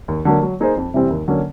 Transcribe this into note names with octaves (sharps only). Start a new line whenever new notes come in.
D#2
D3 F#3 A#3
F#3
A#3 D#4 G#4 C5
F2
C3 E3 G3 C4
D#2
D3 F#3 A#3 C#4